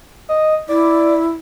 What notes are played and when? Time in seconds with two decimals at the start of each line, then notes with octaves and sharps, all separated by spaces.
0.29 D#5
0.69 E4 D5